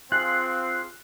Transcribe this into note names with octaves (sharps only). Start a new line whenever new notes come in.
C4 F4 G#4 F5 F#6